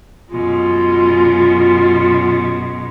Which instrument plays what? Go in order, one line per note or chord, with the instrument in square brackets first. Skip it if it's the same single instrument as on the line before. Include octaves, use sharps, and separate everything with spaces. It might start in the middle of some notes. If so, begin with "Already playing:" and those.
[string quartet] F#2 B2 G#3 [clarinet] F4